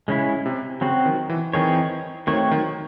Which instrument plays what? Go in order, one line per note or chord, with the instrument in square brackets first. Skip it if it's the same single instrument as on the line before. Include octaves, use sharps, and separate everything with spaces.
[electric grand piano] C#3 [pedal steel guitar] G#3 C#4 E4
[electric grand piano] C3
[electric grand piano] C#3 [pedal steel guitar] F#3 C4 F#4
[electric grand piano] D#3
E3
[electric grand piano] D#3 [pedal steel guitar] E3 C4 D#4 G#4 C#5
[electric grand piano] D#3 [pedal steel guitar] F#3 A3 C4 F#4 C#5
[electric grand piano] D#3